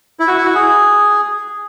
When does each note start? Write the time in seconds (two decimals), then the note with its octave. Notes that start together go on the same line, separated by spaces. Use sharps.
0.20 E4
0.28 F#4
0.38 E4
0.45 F#4
0.55 G#4